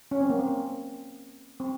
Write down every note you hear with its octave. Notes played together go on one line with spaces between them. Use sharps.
C#4
C4
A#3
C4
C4